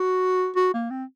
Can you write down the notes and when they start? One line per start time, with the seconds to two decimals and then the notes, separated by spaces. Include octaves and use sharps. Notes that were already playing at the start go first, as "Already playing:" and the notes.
Already playing: F#4
0.56 F#4
0.74 A#3
0.90 C4